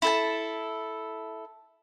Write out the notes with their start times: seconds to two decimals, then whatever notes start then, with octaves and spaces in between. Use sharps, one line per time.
0.02 E4 A4 A5